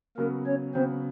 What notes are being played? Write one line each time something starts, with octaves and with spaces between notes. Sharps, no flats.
C#3 F#3 A#3 B3 A#4
C#4 C#5
C#3 F#3 B3 C4 C5